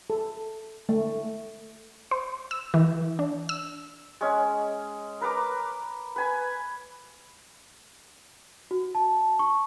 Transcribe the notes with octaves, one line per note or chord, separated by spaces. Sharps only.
A4
A3
C5
E6
E3
D4
E6
G#3 C#4
A#4 B4 A#5 D6
B4 G#5 B5
F#4
A5
C#6